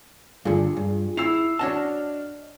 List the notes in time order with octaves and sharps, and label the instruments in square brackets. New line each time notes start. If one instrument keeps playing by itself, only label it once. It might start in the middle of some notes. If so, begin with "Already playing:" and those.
[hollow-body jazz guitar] G2 D3 [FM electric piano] F4 G#4
[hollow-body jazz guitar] G2
[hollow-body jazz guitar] E4 [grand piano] E6 C7 F7
[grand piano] D4 F#4 [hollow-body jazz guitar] C#5 D#5 A5 [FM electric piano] F6